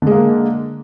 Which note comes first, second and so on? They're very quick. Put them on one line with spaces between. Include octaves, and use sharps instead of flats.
D3 G#3 A#3